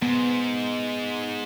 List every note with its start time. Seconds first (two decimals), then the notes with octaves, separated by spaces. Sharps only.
0.02 G#2 B3